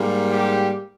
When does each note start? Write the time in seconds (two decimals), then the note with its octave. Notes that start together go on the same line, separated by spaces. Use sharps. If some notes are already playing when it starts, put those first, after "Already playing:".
Already playing: G#2 G3 A#3
0.31 G4